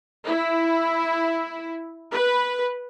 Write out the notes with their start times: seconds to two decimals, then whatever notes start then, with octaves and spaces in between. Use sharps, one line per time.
0.25 E4
2.12 B4